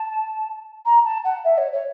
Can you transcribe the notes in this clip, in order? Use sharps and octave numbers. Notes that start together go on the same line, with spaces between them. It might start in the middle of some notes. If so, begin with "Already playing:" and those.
Already playing: A5
A#5
A5
F#5
E5
C#5
C#5